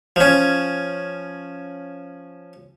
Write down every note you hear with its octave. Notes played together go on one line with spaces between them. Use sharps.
F3 C#4